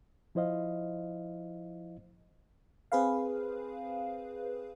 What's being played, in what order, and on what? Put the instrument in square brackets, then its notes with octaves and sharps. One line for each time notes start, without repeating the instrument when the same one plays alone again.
[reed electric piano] F3 E4 C5 D#5 F5
[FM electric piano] C4 G#4 B4 C5 F5